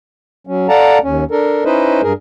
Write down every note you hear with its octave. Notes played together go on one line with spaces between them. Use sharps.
F#3 C#4
A4 D5 F5 F#5 A5 A#5
D#2 C#4
D4 A4 A#4
C#4 D#4 E4 B4 C5 D#5
G2 G#4 A#4